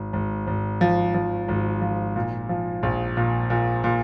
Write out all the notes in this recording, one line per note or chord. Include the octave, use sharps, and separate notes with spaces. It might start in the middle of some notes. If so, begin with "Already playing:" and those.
Already playing: G#1
G#1
G#1
F3
F3
G#1
F3
A#2
F3
A#1
A#2
A#2
A#2